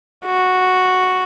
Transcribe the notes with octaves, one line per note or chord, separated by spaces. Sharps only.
F#4